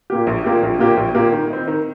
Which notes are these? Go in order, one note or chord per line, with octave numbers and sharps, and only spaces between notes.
A#2 A#3 G4
A#1
A#2 A#3 G4
A#1
A#2 A#3 G4
A#1
A#2 A#3 G4
D#3
C4 D#4
D#3